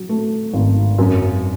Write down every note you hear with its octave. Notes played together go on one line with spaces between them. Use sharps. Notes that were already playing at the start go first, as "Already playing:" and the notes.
Already playing: F#3
A3
G#1
F#2